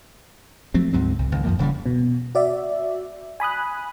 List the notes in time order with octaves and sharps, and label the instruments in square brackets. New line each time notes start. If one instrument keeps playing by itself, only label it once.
[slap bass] F3 F#3 A3 C4
D2 G#2 F#3 C4
C2
C#2 D#3
F#2 F3 A#3
D#1 C#3 E3 G3
[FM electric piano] B2
F#4 D5 E5
G#5 B5 D#6 F#6